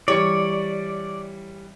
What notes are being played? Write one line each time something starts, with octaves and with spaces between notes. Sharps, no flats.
E3 G3 C#5 D5 C#7